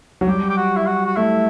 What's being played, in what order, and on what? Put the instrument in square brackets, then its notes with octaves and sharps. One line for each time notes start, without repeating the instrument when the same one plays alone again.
[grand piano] F#3
[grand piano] G3 [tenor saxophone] G4
[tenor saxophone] G4
F#4
E4
F#4
F#4
[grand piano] A3 [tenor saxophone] E4